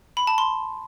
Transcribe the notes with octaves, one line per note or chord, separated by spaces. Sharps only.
B5
A5
C6